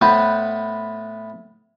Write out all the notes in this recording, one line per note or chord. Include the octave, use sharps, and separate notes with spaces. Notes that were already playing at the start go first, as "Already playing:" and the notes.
A2 B3 B4 C5